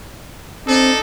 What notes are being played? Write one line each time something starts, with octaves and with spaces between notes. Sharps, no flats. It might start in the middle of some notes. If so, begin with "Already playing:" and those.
C4 D4 D#4 A4